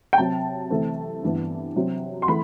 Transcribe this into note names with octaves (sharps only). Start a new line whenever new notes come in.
G5
C3 F#3 C4 A5
C3 E3 A3 C4
G2 E3 B3
C3 F#3 C4
C6
E3 A3 B5